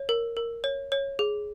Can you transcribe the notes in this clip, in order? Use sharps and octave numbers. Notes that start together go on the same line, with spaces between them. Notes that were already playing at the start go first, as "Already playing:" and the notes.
Already playing: C#5
A#4
A#4
C#5
C#5
G#4